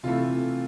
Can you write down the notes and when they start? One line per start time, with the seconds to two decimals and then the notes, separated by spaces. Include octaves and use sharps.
0.03 C3 E3 A3 F4